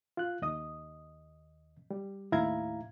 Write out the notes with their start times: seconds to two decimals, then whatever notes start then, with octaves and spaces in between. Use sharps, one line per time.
0.17 F4 F#6
0.42 D#2 D#5 D#6
1.91 G3
2.32 D#2 A2 E4 F5 A#5 G#6